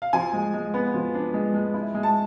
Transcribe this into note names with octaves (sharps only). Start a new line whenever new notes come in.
F5
F3 G#5
G#3
G#3
B3
F3
D4
G#3
G#3
E4
G#3
A5